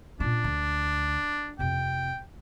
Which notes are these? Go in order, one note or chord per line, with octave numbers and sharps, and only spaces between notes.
A#2 C#4 D4
D2
F2 C3 G5